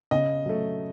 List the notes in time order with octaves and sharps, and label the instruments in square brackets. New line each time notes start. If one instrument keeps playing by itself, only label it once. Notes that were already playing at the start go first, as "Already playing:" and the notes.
[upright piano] C#3 D#5
F#3 A3